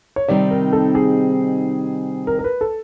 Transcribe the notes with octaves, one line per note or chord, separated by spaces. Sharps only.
C#5
C3 D#3 G3 C4 D#4 D5
A#4
A4
G#4
A#4
A#4
B4
A4